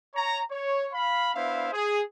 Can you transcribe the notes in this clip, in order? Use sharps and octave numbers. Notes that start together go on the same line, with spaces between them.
C#5 A#5
C#5
F5 B5
B3 D4 E4 C5 E5 F5
G#4